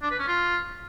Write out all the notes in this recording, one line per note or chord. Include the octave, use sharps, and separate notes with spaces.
D4
B4
C#4
F4